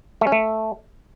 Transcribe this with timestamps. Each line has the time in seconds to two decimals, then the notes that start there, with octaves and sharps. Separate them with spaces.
0.21 A3
0.27 C#4
0.32 A3